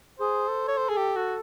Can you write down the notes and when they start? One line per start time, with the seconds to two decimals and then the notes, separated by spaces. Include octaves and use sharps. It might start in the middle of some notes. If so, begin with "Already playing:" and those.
0.19 G#4 C5
0.48 A4
0.68 C#5
0.77 C5
0.89 G#4
0.97 G4
1.16 F#4